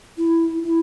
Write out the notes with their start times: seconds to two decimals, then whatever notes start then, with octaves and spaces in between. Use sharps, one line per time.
0.18 E4
0.63 E4